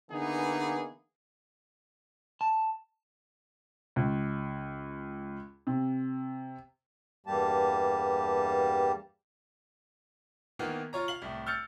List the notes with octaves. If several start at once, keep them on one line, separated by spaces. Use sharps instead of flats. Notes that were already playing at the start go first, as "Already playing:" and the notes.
D3 E3 A#3 B3 D#4 G#4
A5
C#2
C3
E2 G2 G3 A#3 G4 A5
D#3 E3 A#3 B3
F4 C#5 A#5
F5 F#7
C2 A2
E6 F6 G6 A6 C#7